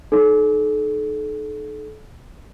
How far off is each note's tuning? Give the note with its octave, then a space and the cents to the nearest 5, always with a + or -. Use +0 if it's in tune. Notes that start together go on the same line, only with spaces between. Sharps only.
D#4 -20 A4 -35